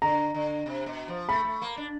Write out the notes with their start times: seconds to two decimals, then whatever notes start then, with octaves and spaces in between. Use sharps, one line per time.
0.02 D3 A#5
0.34 D3
0.66 C3
0.86 B2
1.08 F3
1.29 A3 B5
1.45 A3
1.62 A#3
1.77 D4